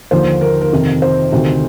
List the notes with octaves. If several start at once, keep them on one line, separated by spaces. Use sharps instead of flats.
D#2 D3 F3 C5
A#4
A#4
F2 C3 D#3
C5
D2 C3 D#3